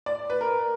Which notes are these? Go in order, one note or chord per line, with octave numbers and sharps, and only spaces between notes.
D5
B4
A#4